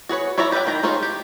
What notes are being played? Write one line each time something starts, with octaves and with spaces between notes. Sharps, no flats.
F#4 G#4 B4 C#5
E4 C#5 D5 E5 A#5
G4 B4 C#5 F#5 G5
D#3 G5 A#5
D#4 F4 G#4 C5 C#5
G4